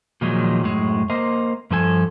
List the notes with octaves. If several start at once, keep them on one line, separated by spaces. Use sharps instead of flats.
A#2 D#3 F3 F#3 G#3 D#4
F#2 A2 G#3
A#3 A#4 C5 D#5
G2 F3 A4 G#5